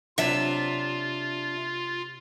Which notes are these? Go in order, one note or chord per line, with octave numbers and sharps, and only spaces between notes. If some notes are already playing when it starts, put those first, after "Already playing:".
C3 F#3 D4 F4 E5